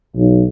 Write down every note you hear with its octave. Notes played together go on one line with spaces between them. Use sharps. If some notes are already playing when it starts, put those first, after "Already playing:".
B1